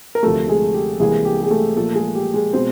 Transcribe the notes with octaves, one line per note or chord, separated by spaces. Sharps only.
A#4
D2 C3 F3 A3 A4
G#3 G#4
G4
C2 C3 E3 G3 G#3 A#3 G#4
G4
G#4
A3 A4
A#2 F3 A3 A#3 A4
G#3 G#4
G4
G#3 G#4
B2 G#3 C4 C5